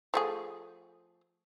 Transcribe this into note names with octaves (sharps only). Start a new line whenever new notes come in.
F3 A3 G#4